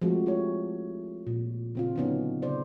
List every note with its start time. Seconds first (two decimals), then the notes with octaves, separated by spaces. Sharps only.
0.02 F3 G#3 A3 C4 F#4
0.26 E4 G4 A4 C#5
1.27 A#2
1.75 C#3 C4 F4
1.96 D3 F#3 B3 C#4 D#4
2.42 C#3 C5 D5